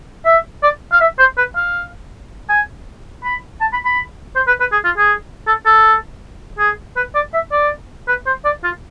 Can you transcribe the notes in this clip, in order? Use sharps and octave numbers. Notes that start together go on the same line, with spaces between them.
E5
D5
F5
E5
C5
B4
F5
G#5
B5
A5
B5
B5
C5
B4
B4
G#4
F4
G#4
A4
A4
G#4
B4
D5
E5
D5
B4
C5
D5
F4